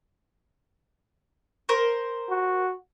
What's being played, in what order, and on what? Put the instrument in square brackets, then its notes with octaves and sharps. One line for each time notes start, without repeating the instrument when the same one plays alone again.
[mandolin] A#4 C5
[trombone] F#4